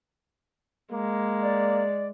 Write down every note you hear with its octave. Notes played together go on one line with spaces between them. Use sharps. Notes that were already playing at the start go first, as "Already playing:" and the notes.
G#3 A#3
D5